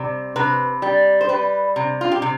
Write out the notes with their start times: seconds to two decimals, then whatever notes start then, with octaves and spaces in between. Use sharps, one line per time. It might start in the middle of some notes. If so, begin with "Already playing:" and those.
Already playing: C3 G3
0.36 C3 B4
0.82 G3
1.21 C5
1.29 G3 B4
1.76 C3
2.01 F4
2.12 G4
2.22 C3